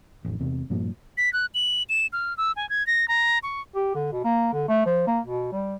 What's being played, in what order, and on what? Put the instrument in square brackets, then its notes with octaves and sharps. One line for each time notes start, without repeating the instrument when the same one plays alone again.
[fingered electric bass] A1 F2
E2 C3
G2 A#2 F3
[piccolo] B6
F#6
F#7
E7
F6
E6
G#5
G#6
A#6
A#5
C#6
[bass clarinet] G4
D3
B2
A#3
D3
A3
F3
A#3
B2
G3